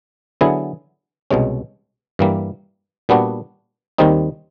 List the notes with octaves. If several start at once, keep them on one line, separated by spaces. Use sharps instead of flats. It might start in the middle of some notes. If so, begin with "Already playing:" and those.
D3 F#3 B3 E4 G#4
C2 B2 G#3 C#4
G2 E3 G3 A#3
A#2 G3 B3 D4 F#4
D#2 D#3 G3 C4 D#4